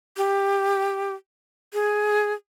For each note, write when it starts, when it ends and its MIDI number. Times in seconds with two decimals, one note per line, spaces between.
0.17 1.14 67
1.74 2.33 68